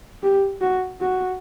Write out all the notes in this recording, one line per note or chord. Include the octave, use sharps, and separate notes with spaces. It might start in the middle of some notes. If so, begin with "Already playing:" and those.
G4
F#4
F#4